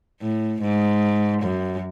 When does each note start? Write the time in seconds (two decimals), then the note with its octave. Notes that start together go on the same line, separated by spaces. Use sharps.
0.21 A2
0.62 G#2
1.42 F#2